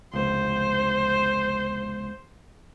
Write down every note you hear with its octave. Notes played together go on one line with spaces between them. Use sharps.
F1 C#2 C5